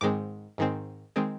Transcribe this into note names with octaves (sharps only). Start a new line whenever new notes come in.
G#2 D#3 G#3 C4 D6
G#2 D#3 G#3 C4
D#3 G#3 C4